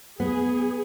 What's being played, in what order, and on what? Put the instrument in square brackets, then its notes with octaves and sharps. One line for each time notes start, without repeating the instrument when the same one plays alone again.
[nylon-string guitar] B3 [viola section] G#4